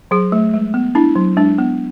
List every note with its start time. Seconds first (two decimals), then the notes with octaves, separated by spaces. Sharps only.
0.11 F#3 G#4
0.32 A3
0.54 G#3
0.74 B3
0.95 D4 E4
1.15 F#3
1.37 G#3 D4
1.58 B3